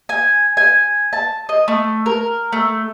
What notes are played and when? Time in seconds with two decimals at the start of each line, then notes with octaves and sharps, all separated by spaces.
0.09 G#5
0.57 G#5
1.13 A5
1.49 D#5
1.68 A3
2.06 A#4
2.52 A3